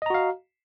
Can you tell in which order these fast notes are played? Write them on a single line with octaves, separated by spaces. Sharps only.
D#5 A#5 F#4 F5